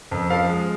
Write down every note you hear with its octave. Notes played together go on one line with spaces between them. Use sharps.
F2
F3 F5
G#3